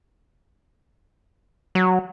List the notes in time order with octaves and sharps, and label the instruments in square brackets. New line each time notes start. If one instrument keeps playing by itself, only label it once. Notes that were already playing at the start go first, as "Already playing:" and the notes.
[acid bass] F#3